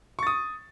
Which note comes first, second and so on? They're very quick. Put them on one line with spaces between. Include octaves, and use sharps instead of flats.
C#6 A6 D#6